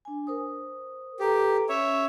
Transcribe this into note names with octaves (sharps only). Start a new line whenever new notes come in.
D4 G#5
A#4 C5 D#6
G4 A4 B4 A#5
C#4 C#5 E5